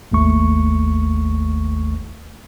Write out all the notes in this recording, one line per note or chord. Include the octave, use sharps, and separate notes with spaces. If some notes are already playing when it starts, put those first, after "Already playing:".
G#1 D#2 A3 C#6